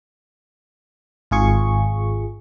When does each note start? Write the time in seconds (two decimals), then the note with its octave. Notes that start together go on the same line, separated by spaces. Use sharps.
1.31 G#1 F4 G#4 C#6